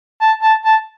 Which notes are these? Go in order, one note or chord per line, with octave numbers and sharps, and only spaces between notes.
A5
A5
A5